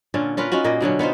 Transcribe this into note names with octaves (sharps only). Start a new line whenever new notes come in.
A#2 D3 C#4 F4
C#4 F4 A#4 B4
C#4 D#4 F4 F#4
A#2 A#3 D#5
B2 D3 F#3 C#4
B3 D#4 F4 C5